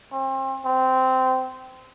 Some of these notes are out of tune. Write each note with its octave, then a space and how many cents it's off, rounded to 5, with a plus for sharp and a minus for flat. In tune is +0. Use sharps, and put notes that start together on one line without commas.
C4 +35
C4 -15